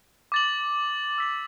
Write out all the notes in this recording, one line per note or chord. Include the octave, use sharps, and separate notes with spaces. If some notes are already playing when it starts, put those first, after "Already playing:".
D6 A6 F#7
E6 B6 F#7